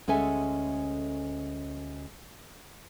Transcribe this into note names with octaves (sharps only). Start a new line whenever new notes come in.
D2 G#3 C#4 A4 E5 G#5